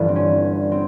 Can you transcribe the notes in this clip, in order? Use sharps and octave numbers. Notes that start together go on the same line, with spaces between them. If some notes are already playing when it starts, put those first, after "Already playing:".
Already playing: G1 G2 E3
C4
C#4
C4